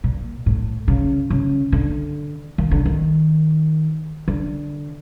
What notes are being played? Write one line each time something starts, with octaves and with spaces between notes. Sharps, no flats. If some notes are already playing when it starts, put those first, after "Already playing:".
A#2
A2
C#3
C#3
D3
D#3
D3
D#3
D3